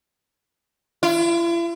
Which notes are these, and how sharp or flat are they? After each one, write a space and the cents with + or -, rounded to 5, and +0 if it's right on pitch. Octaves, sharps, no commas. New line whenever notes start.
E4 +45